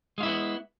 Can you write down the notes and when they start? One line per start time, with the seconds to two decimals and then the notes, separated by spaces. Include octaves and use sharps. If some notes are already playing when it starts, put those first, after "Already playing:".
0.18 G#3
0.20 F4
0.23 E4
0.26 A#3
0.28 B3